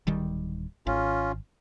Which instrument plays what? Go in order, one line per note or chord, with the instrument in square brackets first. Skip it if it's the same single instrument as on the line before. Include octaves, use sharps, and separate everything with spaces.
[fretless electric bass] D1 D#3 G3
[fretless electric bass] G#1 [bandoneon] C#4 F4